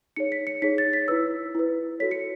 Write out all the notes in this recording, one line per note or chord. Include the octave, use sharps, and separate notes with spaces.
D#4 G#4 C#5 C#7
B6
C#7
D#4 G#4 C#5 B6
A6
B6
E4 B4 E6
E4 B4
F#4 A4 C#5 B6
C#7